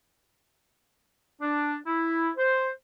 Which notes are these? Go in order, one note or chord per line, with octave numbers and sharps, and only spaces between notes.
D4
E4
C5